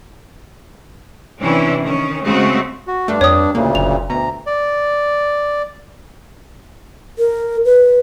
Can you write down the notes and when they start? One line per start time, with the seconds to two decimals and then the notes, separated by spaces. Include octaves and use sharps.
1.40 C3 E3 C#4 D4 E4
1.82 D#3 C#4
2.23 C#3 G#3 A3 C4 F#4
2.87 F#4
3.08 G2 A3 D4
3.21 F2 C#5 D#6
3.55 D2 A#2 C#3 A#3
3.75 F#1 F7
4.10 D2 B2 A#5
4.46 D5
7.19 A#4
7.65 B4